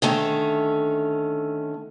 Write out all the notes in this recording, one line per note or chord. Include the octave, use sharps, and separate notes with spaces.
D3 D#3 A3 C#4